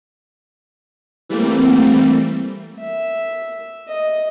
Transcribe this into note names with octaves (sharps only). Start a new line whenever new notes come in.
E3 G3 A3 A#3 C4
E5
D#5